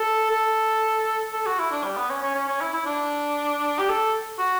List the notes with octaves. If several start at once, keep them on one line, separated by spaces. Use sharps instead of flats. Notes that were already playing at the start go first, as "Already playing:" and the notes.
Already playing: A4
A4
A4
F#4
E4
D4
G3
B3
C#4
C#4
C#4
C#4
E4
E4
D4
G4
A4
F#4